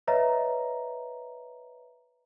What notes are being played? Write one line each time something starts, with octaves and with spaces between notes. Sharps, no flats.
B4 C#5 D#5 E5 A#5